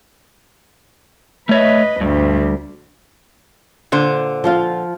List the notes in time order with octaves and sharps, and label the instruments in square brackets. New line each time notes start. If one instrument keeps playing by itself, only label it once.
[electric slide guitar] A3 C#5 E5 [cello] B4 D#5
[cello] D2 G3 [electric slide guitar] G2
[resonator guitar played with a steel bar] A#2 D3 C5
[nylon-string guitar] F3 F4 F5